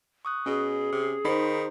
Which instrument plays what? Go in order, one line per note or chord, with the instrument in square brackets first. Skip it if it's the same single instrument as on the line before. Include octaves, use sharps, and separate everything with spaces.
[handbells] C#6 D#6 F#6
[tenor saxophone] B2 [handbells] C#4 [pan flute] G#4
[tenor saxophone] C3
[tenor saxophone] D#3 [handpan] D#4 C5 [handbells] B5